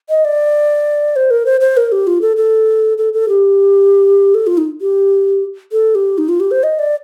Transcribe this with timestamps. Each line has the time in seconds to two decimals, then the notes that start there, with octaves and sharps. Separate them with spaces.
0.09 D#5
0.25 D5
1.16 C5
1.31 A#4
1.46 C5
1.61 C5
1.77 A#4
1.92 G4
2.07 F4
2.21 A4
2.37 A4
2.98 A4
3.13 A4
3.29 G4
4.35 A4
4.47 F4
4.58 D#4
4.81 G4
5.72 A4
5.95 G4
6.18 D#4
6.29 F4
6.40 G4
6.51 C5
6.63 D#5
6.79 D5